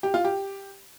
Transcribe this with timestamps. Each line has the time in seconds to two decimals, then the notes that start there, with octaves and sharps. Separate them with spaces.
0.03 G4
0.14 F4
0.25 G4